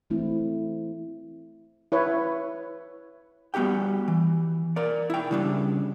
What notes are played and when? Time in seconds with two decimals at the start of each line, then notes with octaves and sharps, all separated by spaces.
0.10 E3 A3 C4 E4
1.92 E4 B4 C#5
3.54 G3 B3 F#4 G4 G5
4.08 E3
4.76 A#4 D5
5.10 E4 G5
5.31 C#3 G3 D4